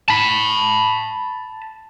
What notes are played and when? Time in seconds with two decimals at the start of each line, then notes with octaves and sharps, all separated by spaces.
0.08 A5 B5